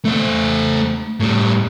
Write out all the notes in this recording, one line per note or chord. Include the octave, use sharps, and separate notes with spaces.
A3 C5
A2 G3